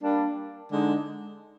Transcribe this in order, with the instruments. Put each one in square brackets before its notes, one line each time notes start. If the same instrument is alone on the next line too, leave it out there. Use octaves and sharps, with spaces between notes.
[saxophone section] G3 A#3 D4
D3 G#3 D#4